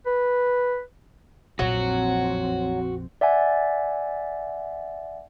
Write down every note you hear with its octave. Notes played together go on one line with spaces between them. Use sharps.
B4
A#1 F2 A#2 F#3 C4 F#4
D5 E5 F#5 G#5